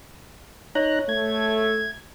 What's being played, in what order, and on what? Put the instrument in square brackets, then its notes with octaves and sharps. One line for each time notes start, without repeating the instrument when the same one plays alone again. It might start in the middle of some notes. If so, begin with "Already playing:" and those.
[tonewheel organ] D#4 A#5 F#6 [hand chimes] C#5
[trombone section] A3 [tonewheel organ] G#6